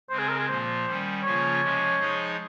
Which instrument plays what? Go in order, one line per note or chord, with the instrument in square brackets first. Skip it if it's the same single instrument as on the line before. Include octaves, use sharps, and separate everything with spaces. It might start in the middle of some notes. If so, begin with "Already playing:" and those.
[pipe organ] C#3 G#3 C4 [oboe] C5
[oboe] G#4
A#4
G#4
[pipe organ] A#2 F3 A#3 [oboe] C5
[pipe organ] D#3 G3 C#4
[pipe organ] C#3 F3 A#3 C#4 F4 [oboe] C#5
[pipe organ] C3 F3 G#3 C#4
F3 G#3 D#4 G#4 D#5